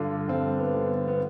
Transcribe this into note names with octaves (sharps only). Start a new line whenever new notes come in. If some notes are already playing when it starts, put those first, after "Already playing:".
Already playing: G2 D3 D4 F4
G2 C4
B3
D3
B3